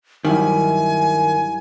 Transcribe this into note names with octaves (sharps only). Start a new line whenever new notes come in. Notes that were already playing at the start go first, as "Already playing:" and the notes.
G2 D#3 F#3 E4 G#5